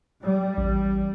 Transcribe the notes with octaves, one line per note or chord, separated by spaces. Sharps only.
G3
A1